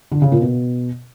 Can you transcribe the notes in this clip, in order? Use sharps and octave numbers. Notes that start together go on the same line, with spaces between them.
D3
C#3
A#2
B2